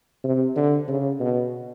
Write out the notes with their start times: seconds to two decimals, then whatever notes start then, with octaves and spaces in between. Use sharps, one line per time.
0.24 C3
0.56 D3
0.88 C#3
1.20 B2